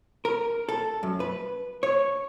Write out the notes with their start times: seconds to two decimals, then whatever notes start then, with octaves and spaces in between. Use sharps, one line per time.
0.25 A#4
0.69 A4
1.03 F#2
1.20 B4
1.83 C#5